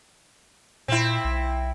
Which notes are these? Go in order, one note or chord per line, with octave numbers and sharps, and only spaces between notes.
A#2 C4 E4
B1